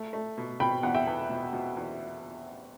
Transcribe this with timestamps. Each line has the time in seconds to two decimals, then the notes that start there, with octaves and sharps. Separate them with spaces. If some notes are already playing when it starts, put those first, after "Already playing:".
Already playing: A3
0.13 A3
0.37 B2
0.60 B2 G5 B5
0.83 E2 F#5
0.94 E5 G5
1.07 E2
1.30 B2
1.53 B2
1.77 E2